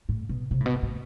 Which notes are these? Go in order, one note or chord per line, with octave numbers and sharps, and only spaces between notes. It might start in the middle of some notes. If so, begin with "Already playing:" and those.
A2
B2
C3
A2
B2
A2